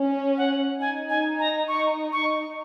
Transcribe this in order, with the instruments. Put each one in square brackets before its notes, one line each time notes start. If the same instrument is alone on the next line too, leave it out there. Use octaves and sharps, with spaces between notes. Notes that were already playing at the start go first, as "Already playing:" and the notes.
Already playing: [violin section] C#4
[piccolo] F#5
[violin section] D#4 [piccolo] G#5
[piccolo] G#5
A#5
C#6
C#6